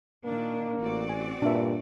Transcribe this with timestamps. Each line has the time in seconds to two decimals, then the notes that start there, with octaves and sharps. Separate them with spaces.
0.25 A#2 D#3 A#3 D4
0.80 A1 C4 F#4 D5
1.09 G#5
1.42 G2 A#2 D4 E5